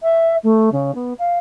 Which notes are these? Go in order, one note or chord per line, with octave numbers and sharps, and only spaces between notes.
E5
A3
C#3
B3
F5